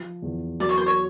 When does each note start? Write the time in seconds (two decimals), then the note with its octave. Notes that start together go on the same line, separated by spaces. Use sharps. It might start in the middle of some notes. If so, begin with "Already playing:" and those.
Already playing: F3
0.22 E2
0.60 F#3 D5
0.69 C#5
0.78 C5
0.86 C#5